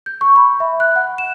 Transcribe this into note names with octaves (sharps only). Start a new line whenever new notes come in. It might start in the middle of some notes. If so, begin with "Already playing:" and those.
G6
C#6
B5
E5
F#6
F#5
E7